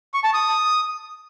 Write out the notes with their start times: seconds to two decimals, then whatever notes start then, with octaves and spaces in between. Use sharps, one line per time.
0.14 C#6
0.24 A5
0.34 D#6